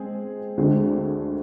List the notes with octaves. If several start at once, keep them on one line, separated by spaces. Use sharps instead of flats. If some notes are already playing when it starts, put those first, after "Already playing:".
Already playing: G#3 C4 G#4
D2 D3 G#3 C4